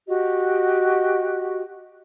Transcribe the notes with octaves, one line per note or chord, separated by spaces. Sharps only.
F#4 G4 D#5